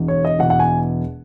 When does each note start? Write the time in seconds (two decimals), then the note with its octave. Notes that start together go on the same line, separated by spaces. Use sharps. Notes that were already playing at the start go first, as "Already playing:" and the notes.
Already playing: E1 E2 B2
0.08 C#5
0.25 D#5
0.39 E1 E2 B2 F#5
0.50 F#5
0.60 G#5